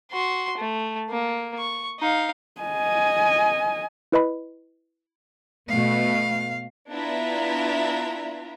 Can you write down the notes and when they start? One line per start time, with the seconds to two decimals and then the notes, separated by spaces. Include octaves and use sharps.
0.12 F#4 C6
0.58 A3
1.10 A#3
1.58 C#6
2.00 D#4 F5
2.61 D#5 G#5
4.12 E4 B4 D#5 B5
5.69 B2 A3 B3 F5
6.91 B3 D4 E4 F4 E5 A#5